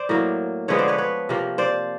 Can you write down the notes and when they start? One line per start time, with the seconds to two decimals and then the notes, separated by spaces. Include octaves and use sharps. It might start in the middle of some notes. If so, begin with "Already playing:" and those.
Already playing: C5 D5
0.09 A2 F#3 A#3
0.68 D3 F3 G#3 B3 B4 C#5
0.79 C5 D5
0.88 B4 C#5
0.98 B4 C#5
1.29 C3 F3 A#3
1.58 C5 D5